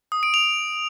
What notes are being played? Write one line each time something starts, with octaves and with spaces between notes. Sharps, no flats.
D#6
D7
F7